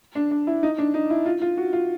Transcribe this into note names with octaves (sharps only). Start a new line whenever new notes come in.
D4
D4
E4
D#4
D4
D#4
E4
F4
F4
F#4
F4